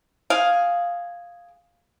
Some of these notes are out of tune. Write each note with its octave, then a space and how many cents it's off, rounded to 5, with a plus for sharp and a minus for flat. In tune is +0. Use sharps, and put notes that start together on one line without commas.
G#4 +0 F5 +0